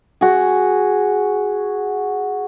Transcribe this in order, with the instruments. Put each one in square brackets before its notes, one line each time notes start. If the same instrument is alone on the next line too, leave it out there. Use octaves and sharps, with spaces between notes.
[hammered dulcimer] F#4 G#4